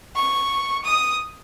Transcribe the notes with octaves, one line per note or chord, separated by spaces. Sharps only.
C#6
D#6